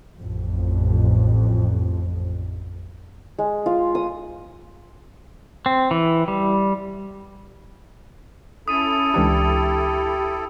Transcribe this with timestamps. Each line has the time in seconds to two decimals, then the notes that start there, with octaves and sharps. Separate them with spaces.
0.20 A1 F2
3.38 G#3
3.66 F4
3.95 D#6
5.66 C4
5.91 E3
6.28 G3
8.68 C#4 E4 A4 D#6 D#7
9.14 C#2 E3 D4 G4